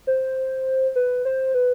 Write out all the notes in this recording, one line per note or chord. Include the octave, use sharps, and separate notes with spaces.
C5
B4
C5
B4